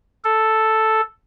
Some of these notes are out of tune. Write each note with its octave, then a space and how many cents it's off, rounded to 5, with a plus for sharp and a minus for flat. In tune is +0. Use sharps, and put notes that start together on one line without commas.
A4 +0